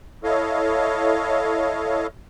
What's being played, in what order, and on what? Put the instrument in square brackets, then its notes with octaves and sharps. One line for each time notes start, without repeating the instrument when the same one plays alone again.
[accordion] E4 A4 C#5 D#5 F5